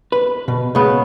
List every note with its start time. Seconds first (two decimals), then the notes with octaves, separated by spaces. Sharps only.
0.12 B4
0.48 B2
0.75 C#3 B3